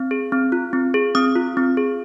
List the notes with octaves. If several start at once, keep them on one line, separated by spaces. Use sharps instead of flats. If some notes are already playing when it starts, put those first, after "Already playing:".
Already playing: C4
G#4
C4
F4
C4
G#4
C4 D#6
F4
C4
G#4